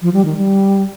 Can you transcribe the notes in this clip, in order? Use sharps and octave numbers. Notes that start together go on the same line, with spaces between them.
F3
G3
D#3
G3